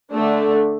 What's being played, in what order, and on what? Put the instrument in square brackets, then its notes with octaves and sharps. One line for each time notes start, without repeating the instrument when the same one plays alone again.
[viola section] D3 A3 D4